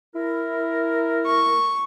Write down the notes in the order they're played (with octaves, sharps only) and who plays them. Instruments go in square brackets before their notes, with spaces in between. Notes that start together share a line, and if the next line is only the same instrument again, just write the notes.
[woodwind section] E4 A#4
[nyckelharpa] C#6